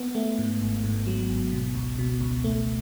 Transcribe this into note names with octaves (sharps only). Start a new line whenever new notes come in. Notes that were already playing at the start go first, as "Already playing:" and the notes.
Already playing: B3
A3
G#2
G#1
G#2
F#3
G#1
B2
C#2
B2
C#2
A3